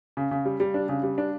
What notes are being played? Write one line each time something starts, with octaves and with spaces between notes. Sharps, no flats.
C#3
C#3
G3
G3
D4
C#3
G3
D4